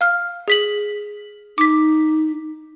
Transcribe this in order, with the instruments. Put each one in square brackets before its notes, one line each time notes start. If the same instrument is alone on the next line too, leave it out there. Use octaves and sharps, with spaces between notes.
[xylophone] F5 F6
G#4 B6 F#7
[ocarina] D#4 [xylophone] D6 B6